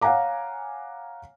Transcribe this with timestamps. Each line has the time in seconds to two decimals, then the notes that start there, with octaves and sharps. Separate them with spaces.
0.01 C#5 F5 F#5 G#5 A#5 D6